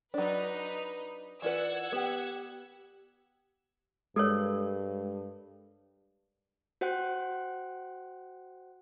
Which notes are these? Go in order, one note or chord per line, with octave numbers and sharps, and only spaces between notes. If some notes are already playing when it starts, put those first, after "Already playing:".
F#3 D4 D#4 B4
E3 F4 B4 D5 F#5 E6 G#6
B3 G4 G5
G2 G#3 A4 A#4 C#5
F#4 C5 F#5 G5 F#6